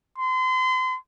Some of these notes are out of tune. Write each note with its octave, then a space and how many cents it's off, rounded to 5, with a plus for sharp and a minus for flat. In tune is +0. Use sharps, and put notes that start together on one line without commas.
C6 -35